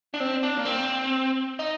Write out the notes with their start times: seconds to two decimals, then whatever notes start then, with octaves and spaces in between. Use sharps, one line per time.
0.14 D4
0.20 C4
0.43 D4
0.58 A#3
0.66 C4
1.59 D#4